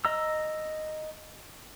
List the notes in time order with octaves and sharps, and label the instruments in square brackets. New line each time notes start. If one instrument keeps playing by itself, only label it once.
[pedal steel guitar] D#5 A#5 E6